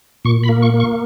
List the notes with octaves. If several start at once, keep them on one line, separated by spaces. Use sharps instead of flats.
A#2 C#6
B5
A#3
C#6
A#3
C#6